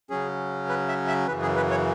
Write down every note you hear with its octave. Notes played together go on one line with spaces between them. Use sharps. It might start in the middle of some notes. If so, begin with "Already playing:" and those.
C#3 F#3 C#4 G#4
B4
E5
E5
F#2 C#3 E3 B4
G#4
B4
C#5